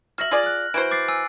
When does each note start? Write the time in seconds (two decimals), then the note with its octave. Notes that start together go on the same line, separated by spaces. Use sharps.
0.18 F#4 E5 F6 A#6 F#7
0.31 F4 G#4 D5
0.43 F6 F#6
0.74 E3 F#4 C5 D7
0.91 D6 A6 C7
1.08 G#5 E6